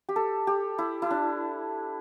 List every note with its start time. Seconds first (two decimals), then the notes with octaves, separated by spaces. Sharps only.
0.09 G4
0.16 A4
0.47 G4
0.78 E4
1.02 E4
1.11 D4